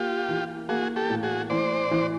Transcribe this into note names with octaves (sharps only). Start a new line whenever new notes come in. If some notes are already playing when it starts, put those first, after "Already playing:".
Already playing: A#3 F4 G4
E3
A#3 F#4 G#4
G4 A4
A2
F#4 G#4
E3 C5 D5
E3